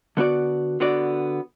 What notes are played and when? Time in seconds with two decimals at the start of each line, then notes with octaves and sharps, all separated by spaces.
0.17 D3 B3 F#4 D5
0.80 D3 B3 F#4 D5